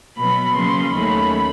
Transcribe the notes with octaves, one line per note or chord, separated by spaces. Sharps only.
B2 F#3 B3 B5
C#3 F#3 A#3 C#4 C6
D#2 D#3 F#3 A3 C#4 B5